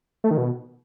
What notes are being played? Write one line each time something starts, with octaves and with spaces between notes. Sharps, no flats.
A3
D#3
B2